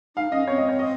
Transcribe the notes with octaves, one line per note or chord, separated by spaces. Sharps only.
D#4 F5
C#4 D#5
C4 C#5
D#5
C#5
D#5